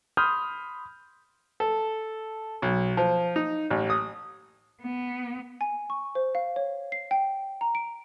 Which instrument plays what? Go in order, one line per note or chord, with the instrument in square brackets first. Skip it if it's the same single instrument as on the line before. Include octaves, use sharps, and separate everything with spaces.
[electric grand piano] B5 C6 D#6 F6 G6
[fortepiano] A4
B1
F3
D#4
A1
D#6
[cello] B3
[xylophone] G#5
C#6
C5
F5
C#5
C7
G5
A#5
D7